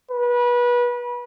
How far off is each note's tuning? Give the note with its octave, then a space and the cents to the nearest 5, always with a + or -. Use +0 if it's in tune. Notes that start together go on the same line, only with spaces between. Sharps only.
B4 -25